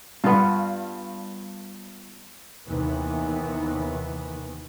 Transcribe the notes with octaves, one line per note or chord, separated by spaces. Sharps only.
G2 B3 F4
D#2 C3 D#3 E3 B3